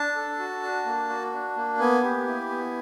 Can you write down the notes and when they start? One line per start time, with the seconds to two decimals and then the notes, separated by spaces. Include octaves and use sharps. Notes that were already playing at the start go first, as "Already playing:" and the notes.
Already playing: D4 A5
0.16 A4
0.39 F#4
0.63 D4
0.86 A#3
1.09 F#4
1.33 D4
1.56 A#3
1.79 B3 G#5
2.04 G4
2.27 E4
2.50 B3